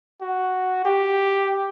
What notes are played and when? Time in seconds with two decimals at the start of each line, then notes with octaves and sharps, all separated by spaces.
0.21 F#4
0.85 G4